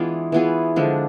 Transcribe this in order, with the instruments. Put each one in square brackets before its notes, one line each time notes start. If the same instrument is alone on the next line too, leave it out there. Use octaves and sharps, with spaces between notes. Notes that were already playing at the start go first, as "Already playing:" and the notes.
Already playing: [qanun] E3 G#3 B3 D4 F4 G#4
E3 B3 F4 G#4
D3 F3 G#3 D4